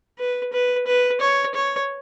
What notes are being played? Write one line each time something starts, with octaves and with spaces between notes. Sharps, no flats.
B4
B4
B4
C#5
C#5